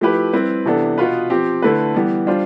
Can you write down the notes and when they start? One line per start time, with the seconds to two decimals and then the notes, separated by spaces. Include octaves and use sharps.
0.01 F3 A3 E4 G4 B4
0.33 G3 C4 E4 B4
0.66 C3 E3 B3 D4 A4
0.98 B2 B3 F4 B4
1.30 F3 C4 G4
1.62 D3 A3 E4 B4
1.95 E3 G3 B3
2.27 G3 D4 F4 C5